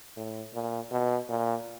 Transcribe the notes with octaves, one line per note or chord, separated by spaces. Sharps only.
A2
A#2
B2
A#2